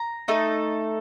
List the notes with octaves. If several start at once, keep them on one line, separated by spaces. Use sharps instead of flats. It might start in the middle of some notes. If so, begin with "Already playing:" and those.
Already playing: A#5
A3 D#4 A4